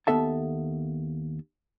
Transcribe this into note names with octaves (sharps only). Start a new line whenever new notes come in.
D#2 F3 B3 A4 E5 A5